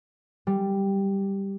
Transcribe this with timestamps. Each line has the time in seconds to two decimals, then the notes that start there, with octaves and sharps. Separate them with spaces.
0.47 G3